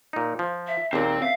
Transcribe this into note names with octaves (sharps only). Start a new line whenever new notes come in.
A#2 D#4
F3
E5
D#2 A#2 C4 G#4
E5 F5